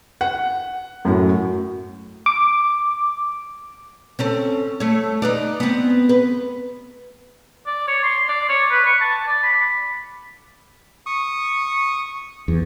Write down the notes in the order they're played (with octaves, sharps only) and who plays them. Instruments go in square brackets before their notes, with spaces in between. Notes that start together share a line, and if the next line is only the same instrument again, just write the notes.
[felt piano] F#5
F#2 A2 F#3
[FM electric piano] D6
[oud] C4 C#4 A4
A3 C#5
D#4 B4 D5
B3 C4
B4
[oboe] D5
C#5
C6
D5
C#5
B4
C#6
A5
D5
B5
[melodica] C#6 D#6
[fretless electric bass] E2